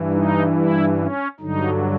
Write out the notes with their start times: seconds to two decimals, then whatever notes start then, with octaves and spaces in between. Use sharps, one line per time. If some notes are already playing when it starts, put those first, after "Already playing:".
Already playing: G2 E3
0.13 D#4
0.55 E4
0.98 C#4
1.40 G2 D3 F#3 D#4